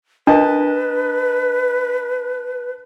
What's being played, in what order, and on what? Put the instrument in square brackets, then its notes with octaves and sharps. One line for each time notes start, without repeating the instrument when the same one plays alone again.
[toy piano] D4 [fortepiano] A#4 D#5 A5 [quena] B4